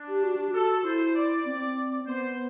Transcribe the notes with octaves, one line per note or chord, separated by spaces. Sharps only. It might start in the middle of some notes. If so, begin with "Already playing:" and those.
Already playing: D4
G4
F#4
G4
F#4
A4
E4 C5
D5
C4
B3 C5